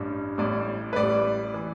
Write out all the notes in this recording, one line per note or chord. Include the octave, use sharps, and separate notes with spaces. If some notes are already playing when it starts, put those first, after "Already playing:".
Already playing: A1 G2 G3
A1 A2 G3 D5
B4
A1 A2 G3 D5
E3